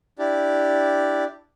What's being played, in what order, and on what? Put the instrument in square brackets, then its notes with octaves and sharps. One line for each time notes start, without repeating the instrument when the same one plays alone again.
[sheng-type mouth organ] D4 E4 G4 D5